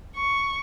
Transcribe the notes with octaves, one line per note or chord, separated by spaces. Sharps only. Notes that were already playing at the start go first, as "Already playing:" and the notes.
C#6